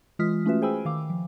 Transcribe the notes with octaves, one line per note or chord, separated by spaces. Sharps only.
E3 G#3 F4 D#6 F6 B6
A3 C#4 F4 F#4 B4 E5
G#4 C5 G5 G#5 B5 E6
D#3 F5 D6
F3